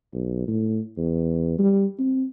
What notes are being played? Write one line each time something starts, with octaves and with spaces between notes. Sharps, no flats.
B1
A2
E2
G3
C4